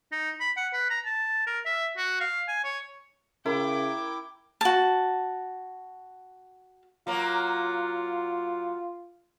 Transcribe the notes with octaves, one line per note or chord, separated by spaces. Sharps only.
D#4
B5
F#5
B4
A#5
A5
A#4
E5
F#4
F5
G#5
C#5
C#3 E4 A#4 G5 D6
F#4 A5
F#3 A#3 F4